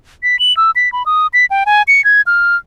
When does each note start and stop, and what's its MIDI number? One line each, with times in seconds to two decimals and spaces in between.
0.23 0.39 95
0.39 0.55 102
0.57 0.71 88
0.76 0.91 95
0.93 1.05 83
1.06 1.27 87
1.33 1.45 95
1.50 1.64 79
1.66 1.83 80
1.88 2.04 97
2.04 2.21 92
2.27 2.56 89